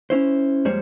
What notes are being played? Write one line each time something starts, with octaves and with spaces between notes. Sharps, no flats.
C#4 E4 C5
F2 G3 G#3 A#3 C5 C#5